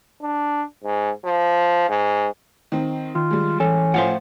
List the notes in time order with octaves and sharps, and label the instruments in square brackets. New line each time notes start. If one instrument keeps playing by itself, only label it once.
[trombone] D4
G#2
F3
G#2
[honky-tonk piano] D#3 C4
[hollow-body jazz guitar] D#3 [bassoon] F4
[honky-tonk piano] G3 G#3
[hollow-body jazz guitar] E3 A4 [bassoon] C#4
[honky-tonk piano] A2 F3 A3 [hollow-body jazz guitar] C5 F5 F#5